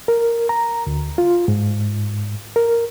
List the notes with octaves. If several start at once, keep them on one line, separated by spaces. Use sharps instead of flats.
A#4
A#5
D2
F4
G#2
A#4